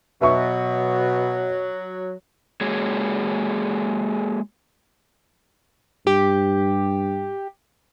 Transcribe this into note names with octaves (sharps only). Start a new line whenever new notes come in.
B2 F#3 E5 C#6
G#3 A#3 F#4 G#4 C#5
G2 G4